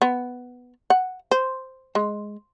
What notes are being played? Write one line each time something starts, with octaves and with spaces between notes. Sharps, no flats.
B3
F#5
C5
G#3